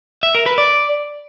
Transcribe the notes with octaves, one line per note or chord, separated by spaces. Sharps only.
E5
A#4
B4
D5